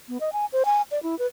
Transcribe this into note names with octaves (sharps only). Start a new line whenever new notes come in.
B3
D#5
G#5
C5
G#5
D5
E4
B4